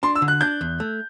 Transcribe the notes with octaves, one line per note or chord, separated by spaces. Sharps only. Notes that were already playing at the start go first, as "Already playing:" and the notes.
D4 C6
E6
D3
F#6
D4 G6
E2
A3